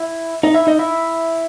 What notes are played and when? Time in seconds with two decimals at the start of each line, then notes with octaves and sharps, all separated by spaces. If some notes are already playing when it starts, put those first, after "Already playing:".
Already playing: E4 E5
0.43 D#4 D#5
0.55 E4 E5
0.67 D#4 D#5
0.79 E4 E5